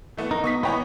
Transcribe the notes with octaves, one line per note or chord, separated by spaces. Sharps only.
E3 A3 B3
D#4 A#4
B2 C#6 D#6 B6
E3 B3 C#5 D#5 F#5 G5 B5